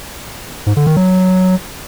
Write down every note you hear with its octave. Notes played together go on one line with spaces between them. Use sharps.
G#2
D3
D#3
F#3